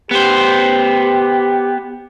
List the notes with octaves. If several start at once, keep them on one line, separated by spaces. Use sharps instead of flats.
B3 G4 C5